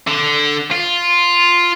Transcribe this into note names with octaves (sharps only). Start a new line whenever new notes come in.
D3
F4